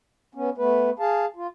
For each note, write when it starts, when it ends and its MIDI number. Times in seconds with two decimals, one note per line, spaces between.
0.35 0.50 59
0.35 0.50 61
0.58 0.90 57
0.58 0.90 59
0.58 0.90 71
0.99 1.25 68
0.99 1.25 77
0.99 1.25 81
1.36 1.47 65